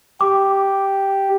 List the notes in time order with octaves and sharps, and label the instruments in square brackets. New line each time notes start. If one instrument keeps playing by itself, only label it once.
[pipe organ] G4 [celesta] D6